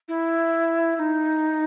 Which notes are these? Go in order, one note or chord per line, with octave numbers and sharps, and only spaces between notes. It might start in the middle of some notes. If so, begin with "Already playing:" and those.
E4
E4
D#4